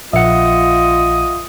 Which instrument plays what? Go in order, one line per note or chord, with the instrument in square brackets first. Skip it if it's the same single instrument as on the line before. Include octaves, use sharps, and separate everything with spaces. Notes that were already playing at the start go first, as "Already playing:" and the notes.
[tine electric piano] A#1 C#7 [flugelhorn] F4 [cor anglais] D#5 [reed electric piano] E5 F#5